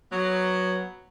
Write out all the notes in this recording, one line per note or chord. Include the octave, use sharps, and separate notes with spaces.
F#3 B3